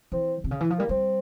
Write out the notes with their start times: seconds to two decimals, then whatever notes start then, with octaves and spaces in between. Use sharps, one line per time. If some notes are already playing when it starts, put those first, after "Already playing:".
0.12 E3 C4
0.44 C3
0.51 C#3
0.60 E3
0.70 F3
0.78 G3 A#3
0.89 G3 C4